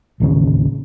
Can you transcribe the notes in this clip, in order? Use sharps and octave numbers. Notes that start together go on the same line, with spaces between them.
A1 D#2 C#3